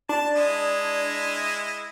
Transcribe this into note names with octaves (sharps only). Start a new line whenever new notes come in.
D4 A5
G#3 E4 D#5